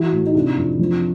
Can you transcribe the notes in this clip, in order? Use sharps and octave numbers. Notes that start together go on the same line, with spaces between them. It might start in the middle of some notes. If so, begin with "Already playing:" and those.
Already playing: E3 E4 F#4
A2
D#4
C3 D4 E4
F2
F3